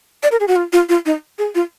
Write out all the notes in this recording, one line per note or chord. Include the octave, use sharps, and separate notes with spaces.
D5
A#4
G#4
F#4
F4
F4
F4
D#4
G#4
F4